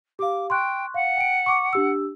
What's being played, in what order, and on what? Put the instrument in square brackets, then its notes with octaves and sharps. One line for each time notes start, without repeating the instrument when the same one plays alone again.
[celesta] G4 F5 [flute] D6
[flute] G5 [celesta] C6 C#6 F#6
[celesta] F5 [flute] F#5
[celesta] G5 D7
C#6 D6
D4 G4 E6